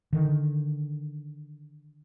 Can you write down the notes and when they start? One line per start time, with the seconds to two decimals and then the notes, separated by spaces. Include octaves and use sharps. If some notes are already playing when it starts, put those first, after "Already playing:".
0.13 D3 D#3